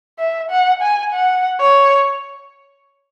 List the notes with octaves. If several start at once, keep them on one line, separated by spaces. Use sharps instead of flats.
E5
F#5
G#5
F#5
C#5